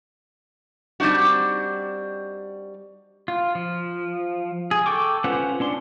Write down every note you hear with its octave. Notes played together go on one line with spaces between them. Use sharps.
G3 C4 D4 D#4 F#4
F4
F3
G#4
A4 G5 C#6 D6
C#4 F4 B4 C5 F#5
C#4 D4 C6